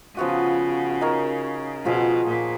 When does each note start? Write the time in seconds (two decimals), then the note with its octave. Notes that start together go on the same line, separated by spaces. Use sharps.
0.17 C#3 F3 B3 F#4
1.01 D#4 A#4 C#5
1.85 B2 F3 B3 F4 G#4
2.27 A#2